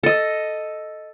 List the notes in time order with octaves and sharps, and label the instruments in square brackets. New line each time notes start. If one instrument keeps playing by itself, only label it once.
[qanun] A4 D#5